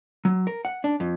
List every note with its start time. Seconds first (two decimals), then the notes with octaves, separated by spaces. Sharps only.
0.25 F#3
0.47 A#4
0.65 F#5
0.84 D4
1.00 F2